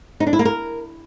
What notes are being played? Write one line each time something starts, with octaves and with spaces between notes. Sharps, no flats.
D#4
D4
E4
A#3
A#4